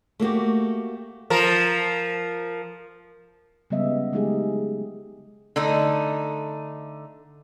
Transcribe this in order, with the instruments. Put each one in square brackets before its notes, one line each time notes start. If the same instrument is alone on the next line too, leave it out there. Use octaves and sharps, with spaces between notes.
[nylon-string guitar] A3 A#3 F#4 G4
[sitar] F3 A#4
[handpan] C#3 G3 G#3 B3 D#5 E5
F#3 G#3 A3 D#4 G4 G#4
[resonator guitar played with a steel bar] D3 A3 D#4